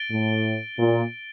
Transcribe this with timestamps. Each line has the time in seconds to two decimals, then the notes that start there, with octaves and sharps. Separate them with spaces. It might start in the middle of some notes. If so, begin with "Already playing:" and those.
Already playing: A6 D7 G7
0.11 A2
0.78 A#2